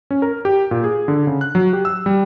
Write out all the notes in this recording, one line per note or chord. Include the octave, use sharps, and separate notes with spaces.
C#4
A#4
G4
A#2
G#4
D3
C#3
F#6
F#3
G4
E6
G3